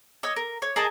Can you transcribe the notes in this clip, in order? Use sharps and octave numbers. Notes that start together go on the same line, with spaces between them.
C#5 D#5 E6
A#4
C#5
G#4 A#4 D#5 A5